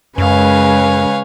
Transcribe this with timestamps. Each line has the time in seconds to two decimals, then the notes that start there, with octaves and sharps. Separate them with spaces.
0.18 F#2 C#3 G#3 B4 C#5 F5 G#5